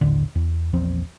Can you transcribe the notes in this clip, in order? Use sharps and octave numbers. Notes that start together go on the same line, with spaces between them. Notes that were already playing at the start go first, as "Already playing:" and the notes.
D#1 A1 D3
E2
A#1 E2 F3 C4